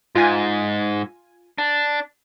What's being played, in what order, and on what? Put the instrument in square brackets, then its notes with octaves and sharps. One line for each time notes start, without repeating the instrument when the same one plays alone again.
[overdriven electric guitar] G#2 [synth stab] F4 G#5
[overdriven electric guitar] D4